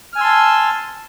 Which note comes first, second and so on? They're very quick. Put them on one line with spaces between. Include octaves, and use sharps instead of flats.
F6 G#5 E6 C6 A5